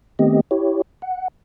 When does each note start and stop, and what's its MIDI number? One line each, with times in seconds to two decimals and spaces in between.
0.19 0.41 51
0.19 0.41 57
0.19 0.41 59
0.19 0.41 60
0.19 0.41 67
0.19 0.41 75
0.51 0.82 64
0.51 0.82 67
0.51 0.82 73
1.02 1.28 78